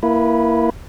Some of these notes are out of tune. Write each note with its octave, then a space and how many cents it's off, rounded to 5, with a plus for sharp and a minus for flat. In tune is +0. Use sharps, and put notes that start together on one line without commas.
A#3 +0 E4 +5 B4 -25